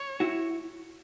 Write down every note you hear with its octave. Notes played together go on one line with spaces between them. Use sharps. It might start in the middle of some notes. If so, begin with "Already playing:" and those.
Already playing: C#5
E4 F#4